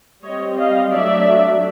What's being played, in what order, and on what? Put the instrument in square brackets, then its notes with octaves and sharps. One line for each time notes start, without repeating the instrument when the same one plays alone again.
[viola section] G3 C4 C#5 D#5
D#5 F5
F#3 A3 D4 D5 E5